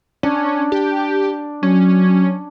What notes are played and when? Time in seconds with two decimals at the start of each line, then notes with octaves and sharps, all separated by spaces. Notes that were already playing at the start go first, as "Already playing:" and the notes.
0.23 C#4 D4
0.72 G4
1.63 F#3 C#4